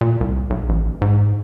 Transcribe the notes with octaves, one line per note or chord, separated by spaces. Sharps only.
A#2
C2
B1
A1
G#2